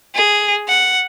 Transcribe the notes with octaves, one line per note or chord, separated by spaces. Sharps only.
G#4
F#5